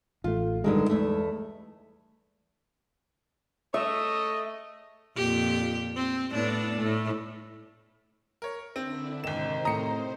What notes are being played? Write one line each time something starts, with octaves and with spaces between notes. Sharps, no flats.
A1 A3 F4
G2 D3 D#3 G3 G#3
E2 A3
A3 C#5 D#5 E5
F2 A#2 G4
C4
A2 B3 D4
A2 A3
A#4 C#5
D3 C4 D4 E4
G#1 C3 D#3 C5 E7
A2 A#5 D#6 C#7